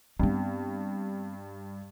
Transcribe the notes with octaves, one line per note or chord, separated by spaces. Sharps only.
G2 B3 C4